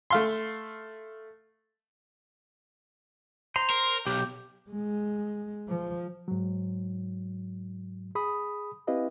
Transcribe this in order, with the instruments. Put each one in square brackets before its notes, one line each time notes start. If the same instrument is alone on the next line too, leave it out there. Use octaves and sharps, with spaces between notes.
[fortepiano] A3 F5 C6
[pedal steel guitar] C5 A#5 C6
[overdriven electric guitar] A#4
[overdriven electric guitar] B1 [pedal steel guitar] G4
[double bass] G#3
F3
[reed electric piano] G#2 F#3
G#4 B5 D#6
C4 E4 G4 B4 D#5 F5